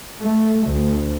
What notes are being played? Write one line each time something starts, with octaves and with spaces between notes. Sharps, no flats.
A3
D2